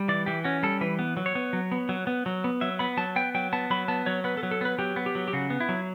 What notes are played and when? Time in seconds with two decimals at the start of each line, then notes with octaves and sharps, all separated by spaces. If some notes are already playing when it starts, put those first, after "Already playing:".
Already playing: G3
0.08 E3 D5
0.26 E3 G4
0.44 C#4 F#4
0.63 G3 A4
0.81 E3 B4
0.99 B3
1.17 F#3
1.26 C#5
1.35 B3
1.53 F#3
1.72 B3
1.89 F#3
2.07 B3
2.26 F#3
2.44 B3
2.61 F#3 E5
2.79 B3 B5
2.97 F#3 A5
3.16 B3 G5
3.35 F#3 G5
3.53 B3 A5
3.70 F#3 B5
3.88 B3 A5
4.06 F#3 C#5
4.24 B3 B4
4.37 A4
4.43 F#3
4.51 A4
4.61 B3 B4
4.79 F#3 G4
4.96 B3
5.06 G4
5.15 F#3
5.28 G4
5.33 C#3 F#4
5.50 B3
5.60 E4
5.69 F#3